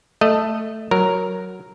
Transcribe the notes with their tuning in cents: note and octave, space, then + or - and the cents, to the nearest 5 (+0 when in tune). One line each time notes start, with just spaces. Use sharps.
A3 +0 D#5 -10
F#3 +0 A#4 +0